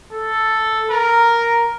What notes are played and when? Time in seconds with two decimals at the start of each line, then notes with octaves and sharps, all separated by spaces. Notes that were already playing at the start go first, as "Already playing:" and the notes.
0.13 A4
0.91 A#4